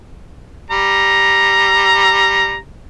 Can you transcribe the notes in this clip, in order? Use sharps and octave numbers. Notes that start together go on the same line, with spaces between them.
G3 A#5